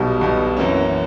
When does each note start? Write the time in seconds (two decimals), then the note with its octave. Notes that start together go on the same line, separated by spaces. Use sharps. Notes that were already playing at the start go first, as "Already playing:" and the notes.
Already playing: B1 B2 G3
0.21 B1 B2 G3
0.57 F#2 E3 A#3 C#4